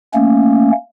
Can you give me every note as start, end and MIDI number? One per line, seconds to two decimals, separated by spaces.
0.14 0.71 57
0.14 0.71 58
0.14 0.71 61